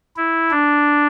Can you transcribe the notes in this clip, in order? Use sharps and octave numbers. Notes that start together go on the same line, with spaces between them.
E4
D4